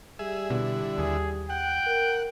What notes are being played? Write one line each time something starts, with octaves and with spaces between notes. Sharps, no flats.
G3 G#4 E5
B2 D3 E4
D#2 G#4
F#5 G5
A#4